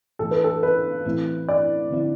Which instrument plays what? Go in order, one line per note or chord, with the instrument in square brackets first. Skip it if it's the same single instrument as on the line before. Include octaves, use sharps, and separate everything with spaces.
[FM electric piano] A2 E3 A3 [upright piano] A4
[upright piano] B4
A4
B4
[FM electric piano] A2 E3 A3 C4 E4
[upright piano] D5
[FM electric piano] D3 F3 C4 E4